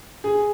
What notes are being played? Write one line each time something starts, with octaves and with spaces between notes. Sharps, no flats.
G#4